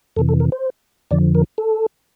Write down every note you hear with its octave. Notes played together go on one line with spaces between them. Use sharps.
F2 C3 E3 A4
A4
A#4
C5
F2 D3 F3 D5
A#4
A4